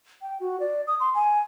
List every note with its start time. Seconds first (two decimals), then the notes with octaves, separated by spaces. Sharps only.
0.22 G5
0.40 F#4
0.60 D5
0.87 D#6
1.00 C6
1.14 G#5